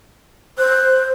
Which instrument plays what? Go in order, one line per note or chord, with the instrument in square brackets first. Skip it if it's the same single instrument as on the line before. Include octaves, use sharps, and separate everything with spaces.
[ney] C5 [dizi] F#6